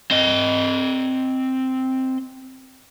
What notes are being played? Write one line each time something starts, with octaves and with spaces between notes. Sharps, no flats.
C4 D#5